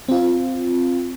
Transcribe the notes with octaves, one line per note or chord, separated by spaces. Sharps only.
C4 F4